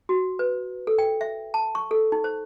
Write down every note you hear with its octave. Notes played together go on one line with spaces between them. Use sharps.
F#4
B4
A4
G5
E5
A5
C#6
A4
D#4
C5